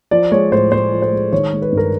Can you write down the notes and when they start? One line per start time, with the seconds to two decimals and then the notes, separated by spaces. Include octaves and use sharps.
0.11 F3 D5
0.32 G#3 C#5
0.52 A2 C5
0.72 A2 C5
0.92 F3
1.02 C5
1.12 G#3
1.32 D#3 C#5
1.53 G#3
1.62 B4
1.72 G2
1.77 A#4